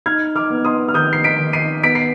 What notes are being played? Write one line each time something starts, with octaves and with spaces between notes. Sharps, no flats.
D#4 F6 G#6
D6 F6
B3
C6 D#6
F6
D#3 D#6 G6
C7
B6 D7
D#3
C7 D#7
B3 B6 D7
C7